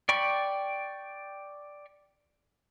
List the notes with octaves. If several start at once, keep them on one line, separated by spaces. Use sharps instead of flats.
D5 G5 B5 C#6